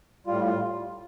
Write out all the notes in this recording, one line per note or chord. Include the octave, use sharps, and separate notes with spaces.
A2 G3 F4
F4